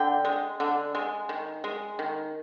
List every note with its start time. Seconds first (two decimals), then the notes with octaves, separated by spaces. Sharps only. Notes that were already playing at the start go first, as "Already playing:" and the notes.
Already playing: D3 G5
0.25 G#3
0.60 D3
0.95 G#3
1.29 D#3
1.64 G#3
1.99 D#3